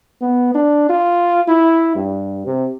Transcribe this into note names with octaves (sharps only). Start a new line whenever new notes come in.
B3
D4
F4
E4
G2
C3